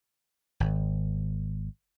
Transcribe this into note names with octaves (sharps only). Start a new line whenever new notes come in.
G#1